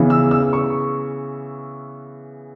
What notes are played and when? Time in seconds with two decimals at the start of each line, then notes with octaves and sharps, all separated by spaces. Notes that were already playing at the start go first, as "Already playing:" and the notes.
Already playing: C#3 E3 B3
0.10 E6
0.31 E6
0.53 C#6